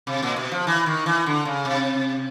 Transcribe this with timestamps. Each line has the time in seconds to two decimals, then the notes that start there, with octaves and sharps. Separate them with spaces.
0.07 C3
0.23 A#2
0.36 B2
0.52 F3
0.67 E3
0.86 D#3
1.06 E3
1.26 D3
1.45 C#3
1.65 C3